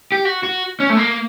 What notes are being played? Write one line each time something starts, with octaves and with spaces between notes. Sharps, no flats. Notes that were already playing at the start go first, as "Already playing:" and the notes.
G4
F#4
F#4
C#4
A3
A#3